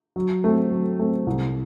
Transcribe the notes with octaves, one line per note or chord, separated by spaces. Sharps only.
F#3
A3 C4
F#3
A3 C4
C2